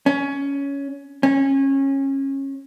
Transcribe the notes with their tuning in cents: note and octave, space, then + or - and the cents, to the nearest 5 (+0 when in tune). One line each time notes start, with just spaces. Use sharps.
C#4 +15
C#4 -25